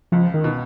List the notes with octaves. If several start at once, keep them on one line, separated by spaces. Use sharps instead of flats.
C#2 F3
D#3
B2